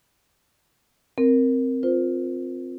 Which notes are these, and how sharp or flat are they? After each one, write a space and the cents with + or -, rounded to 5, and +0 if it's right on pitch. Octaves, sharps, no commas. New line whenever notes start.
C4 +0 A#4 +0
F4 +10 C5 -20